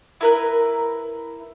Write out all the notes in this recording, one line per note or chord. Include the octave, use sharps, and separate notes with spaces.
E4 A#4 B4